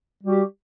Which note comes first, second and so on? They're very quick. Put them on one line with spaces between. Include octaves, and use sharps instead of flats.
G3 F#4 G4